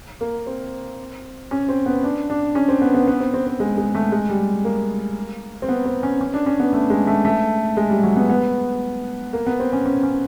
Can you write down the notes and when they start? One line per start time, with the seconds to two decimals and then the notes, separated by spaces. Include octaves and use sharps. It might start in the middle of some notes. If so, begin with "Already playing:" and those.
0.21 A#3
0.47 C4
1.51 C#4
1.69 C4
1.86 B3
2.03 D4
2.30 D4
2.55 C#4
2.68 C4
2.82 B3
2.95 B3
3.08 B3
3.20 C4
3.34 C4
3.47 C4
3.60 G#3
3.77 G#3
3.95 A3
4.12 G#3
4.29 G3
4.65 A#3
5.62 C4
5.69 B3
5.85 C4
6.03 C#4
6.21 C#4
6.34 D4
6.46 C#4
6.60 B3
6.73 A3
6.90 G#3
7.07 A3
7.25 A3
7.77 G#3
7.90 G3
8.03 F#3
8.16 B3
8.30 B3
9.33 A#3
9.47 B3
9.60 C4
9.73 C#4
9.86 C#4
10.03 C#4